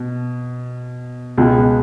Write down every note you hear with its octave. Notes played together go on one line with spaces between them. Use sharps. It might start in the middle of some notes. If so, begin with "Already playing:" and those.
Already playing: B2
C#2 B2 G#3